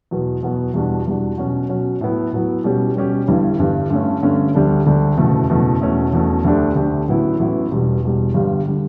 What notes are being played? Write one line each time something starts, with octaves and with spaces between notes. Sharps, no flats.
E2 B2 F#3 B3
E2 B2 F#3 B3
E2 B2 G3 D4 F#4
E2 B2 G3 D4 F#4
B2 F#3 C#4 F#4
B2 F#3 C#4 F#4
A2 F#3 B3 E4
A2 F#3 B3 E4
B2 G3 C#4 G4
B2 G3 C#4 G4
G1 G2 E3 G3
G1 G2 E3 G3
G2 D3 A3 C#4
G2 D3 A3 C#4
D2 D3 G3 D4 G4
D2 D3 G3 D4 G4
F#1 E2 B2 A3
F#1 E2 B2 A3
E1 E2 B2 A3 C#4
E1 E2 B2 A3 C#4
D2 D3 A3 D4 G4
D2 D3 A3 D4 G4
A1 A2 F#3 B3 E4
A1 A2 F#3 B3 E4
E1 E2 B2 G3
E1 E2 B2 G3
G1 G2 D3 G3
D3 G3